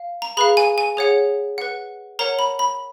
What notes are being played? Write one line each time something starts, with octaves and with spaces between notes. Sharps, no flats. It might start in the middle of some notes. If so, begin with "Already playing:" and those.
Already playing: F5
A#5
G#4 B4 F5 B5
G#5
G#5
G#4 C#5 F#5
B4 F#5
A#4 C#5 F#5 A#5
B5
B5